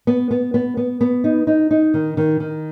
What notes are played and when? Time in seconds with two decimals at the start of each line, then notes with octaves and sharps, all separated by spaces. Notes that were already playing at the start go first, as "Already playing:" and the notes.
0.07 B3
0.31 B3
0.54 B3
0.77 B3
1.01 B3
1.24 D#4
1.47 D#4
1.71 D#4
1.94 D#3
2.17 D#3
2.40 D#3